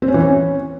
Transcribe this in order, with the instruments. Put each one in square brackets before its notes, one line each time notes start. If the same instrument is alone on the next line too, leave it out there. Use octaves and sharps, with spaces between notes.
[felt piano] C4
C#4
E3
C#4